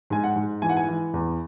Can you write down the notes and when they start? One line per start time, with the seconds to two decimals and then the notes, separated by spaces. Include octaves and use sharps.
0.10 G#2 G#5
0.24 F#5
0.36 G#2
0.62 E3 G#5
0.69 F#5
0.77 G#5
0.89 E3
1.14 E2